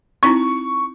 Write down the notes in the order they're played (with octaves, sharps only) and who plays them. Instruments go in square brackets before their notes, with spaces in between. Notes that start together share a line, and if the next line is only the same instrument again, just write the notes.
[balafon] C4 D#4 E4 [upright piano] C#6